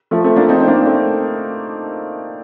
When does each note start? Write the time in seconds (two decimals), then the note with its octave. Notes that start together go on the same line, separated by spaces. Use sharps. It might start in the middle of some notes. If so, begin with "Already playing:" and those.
0.11 F3 A3
0.24 A3 C4
0.36 A#3 D4
0.49 C4 D#4
0.60 C4
0.68 A#3 D4
0.86 A3 C4